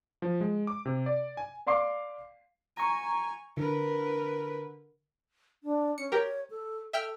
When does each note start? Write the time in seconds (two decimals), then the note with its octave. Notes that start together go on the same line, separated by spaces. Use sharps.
0.22 F3
0.41 G#3
0.67 D6
0.85 C3
1.06 D5
1.37 G#5
1.67 D5 F5 C6 D6 C7
2.77 G#5 A#5 C#6
3.57 D3 A#4 B4
5.64 D4
5.98 C#4 C#7
6.12 G4 A#4 C#5
6.50 A4
6.93 A4 E5 G5 F6